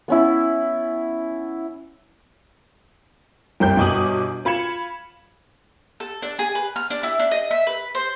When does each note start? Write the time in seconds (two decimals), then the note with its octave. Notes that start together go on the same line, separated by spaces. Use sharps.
0.08 B3 C#4 E4
3.60 G1 C2 G5 G6
3.77 G1 B2 G#5 D6 D#6 F#7
4.45 F4 B5 G#6 C#7 E7
6.00 A4
6.22 D4
6.39 G#4
6.55 B4
6.76 F6
6.90 D4
7.03 E4
7.19 D4
7.31 D#5
7.51 E5
7.67 B4
7.95 C5